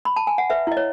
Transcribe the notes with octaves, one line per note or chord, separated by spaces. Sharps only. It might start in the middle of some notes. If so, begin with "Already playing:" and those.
B5
A5
G#5
F#5
B4 E5
E4 D#5
C#5